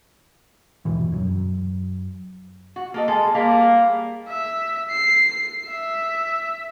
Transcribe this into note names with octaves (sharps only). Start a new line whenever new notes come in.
G1 D#2 B2 E3
F#2 F#3
F#4
A#3 A4 D#5
G#3 A4
G3 A#3 G4 G#4
E5
C7
E5